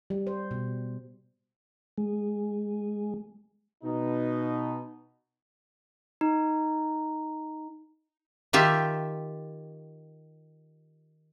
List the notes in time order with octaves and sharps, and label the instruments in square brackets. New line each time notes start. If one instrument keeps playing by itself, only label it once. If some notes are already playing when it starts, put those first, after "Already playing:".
[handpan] G3
C5
B2
[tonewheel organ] G#3
[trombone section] B2 D#4
[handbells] D#4
[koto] D#3 F4 G4 E5